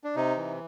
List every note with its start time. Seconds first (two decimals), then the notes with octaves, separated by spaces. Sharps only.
0.04 D4
0.16 C3 D#4
0.37 E3